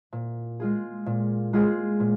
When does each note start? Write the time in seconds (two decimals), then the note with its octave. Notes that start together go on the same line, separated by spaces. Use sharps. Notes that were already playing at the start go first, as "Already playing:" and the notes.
0.12 A#2
0.60 G#3 F4 G#4
1.06 A#2
1.53 G#3 F4 G#4
2.00 A#2